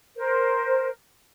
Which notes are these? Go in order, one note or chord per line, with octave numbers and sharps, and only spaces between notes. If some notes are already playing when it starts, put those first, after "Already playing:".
A#4 C5